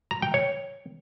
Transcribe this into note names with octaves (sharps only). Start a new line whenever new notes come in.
A#5
G5
C#5